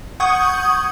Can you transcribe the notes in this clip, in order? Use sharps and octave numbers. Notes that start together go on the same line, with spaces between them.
F#5 C#6 D#6 G6 G#6